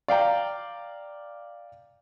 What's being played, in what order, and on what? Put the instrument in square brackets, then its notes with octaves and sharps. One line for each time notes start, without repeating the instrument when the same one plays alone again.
[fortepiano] D5 F5 G5 A#5